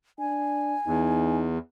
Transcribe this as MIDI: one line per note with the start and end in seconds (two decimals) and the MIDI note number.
0.19 0.75 62
0.19 1.39 80
0.87 1.58 40
0.87 1.49 63